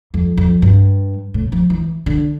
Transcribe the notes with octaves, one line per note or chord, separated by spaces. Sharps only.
F2
F2
G2
A2
F3
E3
D3